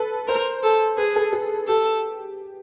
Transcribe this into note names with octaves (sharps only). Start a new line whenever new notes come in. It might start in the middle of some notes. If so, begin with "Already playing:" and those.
Already playing: A4 B4
A#4 C5
A4
G#4 B4
A4
G#4
G4 A4